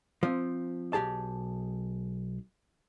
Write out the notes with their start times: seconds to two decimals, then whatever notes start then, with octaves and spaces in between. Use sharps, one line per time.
0.23 F3 C4
0.93 B1 B2 G4 G#4 A5